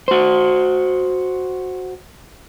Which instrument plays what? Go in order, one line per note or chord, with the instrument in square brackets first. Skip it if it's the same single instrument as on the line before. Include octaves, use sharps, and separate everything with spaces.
[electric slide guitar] F#4 C5